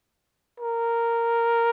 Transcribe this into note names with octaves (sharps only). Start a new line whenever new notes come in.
A#4